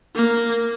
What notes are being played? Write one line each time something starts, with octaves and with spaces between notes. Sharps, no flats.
A#3